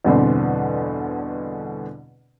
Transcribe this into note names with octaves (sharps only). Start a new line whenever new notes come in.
E2 G2 B2 D3 C4